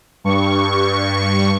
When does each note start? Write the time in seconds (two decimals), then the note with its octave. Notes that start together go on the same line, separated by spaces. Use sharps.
0.24 G2 C#6